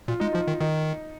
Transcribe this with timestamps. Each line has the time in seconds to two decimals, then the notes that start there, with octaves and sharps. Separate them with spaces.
0.08 A#2 F4
0.20 G#3 D#4
0.33 F3 F4
0.47 D#3
0.60 D#3 D#4